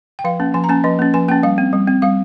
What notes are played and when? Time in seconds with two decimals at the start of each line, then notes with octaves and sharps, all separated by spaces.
0.19 G5
0.24 F3 F5
0.40 A#3 C#4
0.54 F3 G#5
0.64 A#5
0.69 A#3 C#4 G#5
0.84 F3 D#5
0.99 A#3 C#4
1.14 F3 G#5
1.28 A#3 C#4 G5
1.43 G3 F5
1.58 C4
1.73 G3
1.88 C4
2.02 G3 F5